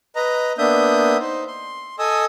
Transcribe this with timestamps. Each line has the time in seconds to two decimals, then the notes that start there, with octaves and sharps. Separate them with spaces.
0.16 B4 D#5 A#5
0.58 A#3 B3 D4 E5 D#6 G6
1.20 D#4 C5
1.48 C6
1.99 A4 D#5 G#5 D#6 E6